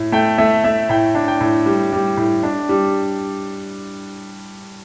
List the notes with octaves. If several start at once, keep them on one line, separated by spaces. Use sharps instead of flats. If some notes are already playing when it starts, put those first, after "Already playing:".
Already playing: A2
A3 G5
A3 E5
A3 E5
A2 G5
D4
G5
A2
G3
G3
A2
D4
G3